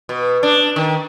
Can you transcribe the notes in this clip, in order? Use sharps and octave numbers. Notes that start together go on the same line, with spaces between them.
B2
D4
D#3